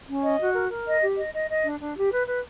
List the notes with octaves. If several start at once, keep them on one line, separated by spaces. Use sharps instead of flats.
C#4
D#5
F#4
A#4
A#4
D#5
G4
D#5
D#5
D#5
D4
D4
G4
B4
B4